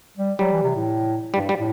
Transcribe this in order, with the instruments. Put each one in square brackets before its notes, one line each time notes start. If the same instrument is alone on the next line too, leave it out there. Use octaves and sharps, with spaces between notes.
[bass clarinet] G3
[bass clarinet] F#3 [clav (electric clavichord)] G3
[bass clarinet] E3
C3
A2
[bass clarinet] G2 [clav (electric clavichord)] G3
[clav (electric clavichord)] G3
[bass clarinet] A2